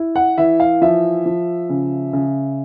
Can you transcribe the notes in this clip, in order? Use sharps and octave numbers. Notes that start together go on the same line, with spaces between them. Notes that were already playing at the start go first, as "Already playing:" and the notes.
Already playing: E4
F#5
E3 E5
F5
F3 E5
F3
C#3
C#3